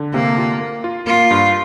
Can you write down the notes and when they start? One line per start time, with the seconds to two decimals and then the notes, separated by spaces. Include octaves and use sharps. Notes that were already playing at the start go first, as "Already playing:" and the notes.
Already playing: D3
0.14 C3 A#3
0.38 F4
0.61 A#3
0.84 F4
1.07 A#3 F4
1.31 G2